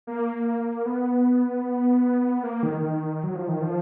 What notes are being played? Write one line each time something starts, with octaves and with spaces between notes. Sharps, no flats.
A#3
B3
A#3
D#3
D#3
F#3
F3
D#3
F3